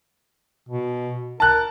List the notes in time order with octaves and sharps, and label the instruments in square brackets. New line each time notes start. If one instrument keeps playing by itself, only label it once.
[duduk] B2
[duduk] A#4 [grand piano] A5 F#6